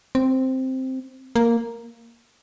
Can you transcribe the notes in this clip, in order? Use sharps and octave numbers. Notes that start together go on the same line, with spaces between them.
C4
A#3